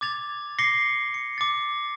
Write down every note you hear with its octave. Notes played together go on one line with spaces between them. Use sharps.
D6 G#6 A6 F7
D6 A#6 C7 C#7 G7
C#7
D6 A6